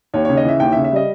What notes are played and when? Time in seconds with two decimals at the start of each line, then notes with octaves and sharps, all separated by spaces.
0.14 D#2 C#5
0.25 C#3 C#5
0.37 D#5
0.45 E3 E5
0.60 D#2 G5
0.72 E5
0.76 C#3
0.84 E5
0.92 G3 D#5